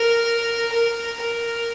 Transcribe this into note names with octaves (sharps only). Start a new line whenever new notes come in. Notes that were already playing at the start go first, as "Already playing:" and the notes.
Already playing: A#4
A#4
A#4